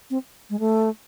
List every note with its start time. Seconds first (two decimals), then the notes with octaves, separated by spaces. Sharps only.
0.10 C4
0.50 G#3
0.60 A3